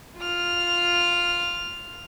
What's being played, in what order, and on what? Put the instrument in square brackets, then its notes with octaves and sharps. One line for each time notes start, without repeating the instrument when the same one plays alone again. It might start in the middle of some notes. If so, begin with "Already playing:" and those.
[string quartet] F4 F6